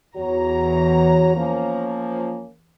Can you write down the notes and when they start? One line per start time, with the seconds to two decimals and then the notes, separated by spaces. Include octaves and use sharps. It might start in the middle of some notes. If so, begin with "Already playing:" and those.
0.16 E2 F#4 C#5 A#5
1.36 F3 A#3 C#4